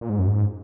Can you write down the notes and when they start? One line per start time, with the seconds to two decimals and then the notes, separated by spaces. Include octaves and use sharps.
0.01 A#2
0.09 G#2
0.19 F#2
0.27 G#2